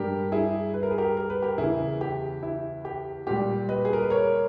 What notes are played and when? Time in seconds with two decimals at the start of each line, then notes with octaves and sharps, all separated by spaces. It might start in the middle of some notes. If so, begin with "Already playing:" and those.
Already playing: G2 G3 G4 A#4
0.32 E4 G#4
0.74 B4
0.83 A#4
0.91 G#4
0.98 G4 A#4
1.17 A#4
1.30 B4
1.42 G4 A#4
1.58 E2 C#3 E3 E4 G#4
2.01 G4
2.43 E4
2.85 G4
3.27 A#2 G3 G4
3.69 B4 D#5
3.85 G#4
3.93 A#4
4.02 B4
4.10 A#4 C#5